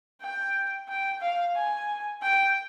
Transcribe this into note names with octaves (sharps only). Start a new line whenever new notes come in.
G5
G5
F5
G#5
G5